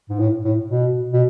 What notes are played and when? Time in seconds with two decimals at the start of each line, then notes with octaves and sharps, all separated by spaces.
0.10 G#2
0.19 A2
0.44 A2
0.70 B2
1.13 B2